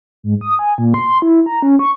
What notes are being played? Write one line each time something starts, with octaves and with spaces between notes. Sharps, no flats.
G#2
D#6
G#5
A#2
C6
E4
A#5
C#4
C#6